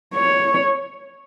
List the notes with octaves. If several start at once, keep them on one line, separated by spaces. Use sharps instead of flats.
C#5